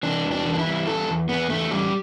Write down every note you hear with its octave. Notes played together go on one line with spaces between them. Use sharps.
E3 D4
E2
D4
E3
D4
E4
G3
E2 A4
E2
E2 B3
E2 A3
E2 G3